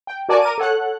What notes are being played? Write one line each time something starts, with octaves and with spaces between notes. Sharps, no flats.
G5
F#4 A#4 D5 G#5 A5 D6
A#4 D6 D#7
A4 C#5 F#5 F#6